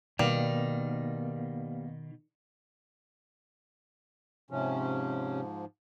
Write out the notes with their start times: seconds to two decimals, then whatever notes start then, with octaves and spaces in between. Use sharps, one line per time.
0.19 B2 D#3 G3 A#3 B3 F5
4.51 G#2 C3 F3 C#4